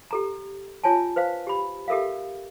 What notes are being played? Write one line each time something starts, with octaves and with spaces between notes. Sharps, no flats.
G4 A4 A#5
F4 C#5 G#5 A5
B4 C5 F5
G4 B5
G4 A4 A#4 E5 F5